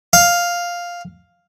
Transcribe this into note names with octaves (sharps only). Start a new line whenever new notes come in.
F5